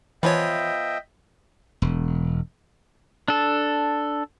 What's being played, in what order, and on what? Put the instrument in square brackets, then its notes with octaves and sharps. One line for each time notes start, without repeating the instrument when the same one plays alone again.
[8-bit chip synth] E3 C#5 [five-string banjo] F3 B3 [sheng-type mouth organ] D#5 E5 G5
[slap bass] E1
[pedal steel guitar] D4 A4